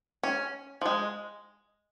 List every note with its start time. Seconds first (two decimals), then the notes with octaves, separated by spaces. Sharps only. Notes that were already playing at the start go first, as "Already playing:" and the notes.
0.23 C#4
0.81 F3
0.86 G#3